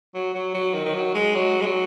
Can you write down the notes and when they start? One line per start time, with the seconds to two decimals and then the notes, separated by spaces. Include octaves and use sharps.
0.14 F#3
0.34 F#3
0.54 F#3
0.74 D#3
0.86 D#3
0.94 F#3
1.14 G#3
1.35 F#3
1.61 G#3
1.66 F#3